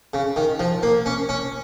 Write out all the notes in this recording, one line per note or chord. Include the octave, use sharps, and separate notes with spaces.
C#3
D#3
F3
A#3
C#4
C#4